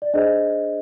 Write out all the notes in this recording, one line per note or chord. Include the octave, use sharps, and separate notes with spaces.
D5
D4 G#4 C5 D#5